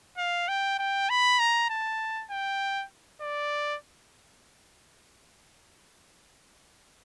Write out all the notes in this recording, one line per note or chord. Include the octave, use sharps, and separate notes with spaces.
F5
G5
G5
B5
A#5
A5
G5
D5